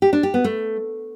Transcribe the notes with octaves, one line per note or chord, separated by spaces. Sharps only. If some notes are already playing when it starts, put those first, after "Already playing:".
G4
D4
G4
B3
A3